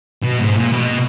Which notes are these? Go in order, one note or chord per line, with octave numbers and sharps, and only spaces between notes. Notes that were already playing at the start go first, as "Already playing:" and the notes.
B2
G#2
A#2
B2